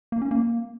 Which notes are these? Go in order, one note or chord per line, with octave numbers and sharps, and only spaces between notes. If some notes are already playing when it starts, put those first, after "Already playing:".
A#3
C#4
A#3